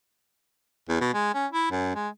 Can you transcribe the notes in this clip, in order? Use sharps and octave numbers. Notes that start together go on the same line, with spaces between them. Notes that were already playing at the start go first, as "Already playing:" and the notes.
E2
B2
G#3
C#4
E4
F#2
G#3